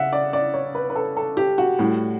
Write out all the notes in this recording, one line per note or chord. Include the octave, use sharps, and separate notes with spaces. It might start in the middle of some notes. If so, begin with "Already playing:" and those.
Already playing: C#3 E5 F#5
D5
D5
C#5
B4
B4
A4
A4
G4
F#4
A2 G3